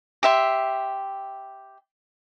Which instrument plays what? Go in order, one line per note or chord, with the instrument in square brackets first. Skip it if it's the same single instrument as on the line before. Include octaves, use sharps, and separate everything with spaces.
[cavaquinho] G4 E5 C6